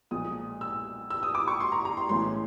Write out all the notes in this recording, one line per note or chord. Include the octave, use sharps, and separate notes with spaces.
B1 A#2 F3 G#3 D#6
E6
E6
D#6
D6
C#6
C6
A#5
A#5
C6
B1 A2 E3 G#3 C#4 C6